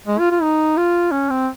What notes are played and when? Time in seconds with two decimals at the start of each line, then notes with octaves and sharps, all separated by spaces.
0.07 G#3
0.19 F4
0.31 F4
0.42 D#4
0.77 F4
1.11 C#4
1.30 C4